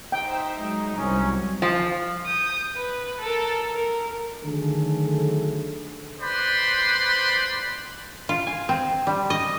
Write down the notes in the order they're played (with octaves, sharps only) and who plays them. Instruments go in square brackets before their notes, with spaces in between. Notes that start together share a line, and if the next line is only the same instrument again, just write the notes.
[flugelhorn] D#4 [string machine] C5 E5 [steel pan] G5
[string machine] F#3 [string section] G#3
[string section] C2 [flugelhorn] C#4
[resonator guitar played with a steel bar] F3
[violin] D#6 G6
B4
A4 A#4
A#4
[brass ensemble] D3 D#3 F#3 A3 G#4 A4
[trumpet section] B4 C5 D5 B5 C6
[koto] F4
G#5
C4
G3
D#5